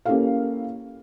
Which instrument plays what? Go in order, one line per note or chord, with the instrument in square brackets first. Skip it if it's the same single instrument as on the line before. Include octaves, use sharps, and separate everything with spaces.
[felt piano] A#3 C#4 E4 G4 A4 F5